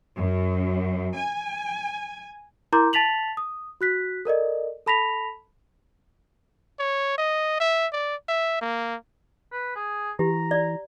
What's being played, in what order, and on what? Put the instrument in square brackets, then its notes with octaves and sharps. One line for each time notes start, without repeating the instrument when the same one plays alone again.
[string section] F#2
G#5
[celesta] E4 A#4 A#5 C6 D6 G6
A5 A6 B6 F7 F#7
D#6
F#4 F#6 B6
A4 A#4 D5 D#5
A4 A5 B5 A#6 B6 F7
[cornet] C#5
D#5
E5
D5
E5
A#3
[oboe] B4
G#4
[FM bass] E3 [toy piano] G4 [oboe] A#5
[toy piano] D5